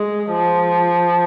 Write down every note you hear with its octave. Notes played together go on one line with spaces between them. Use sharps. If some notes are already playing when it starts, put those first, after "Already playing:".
Already playing: G#3
F3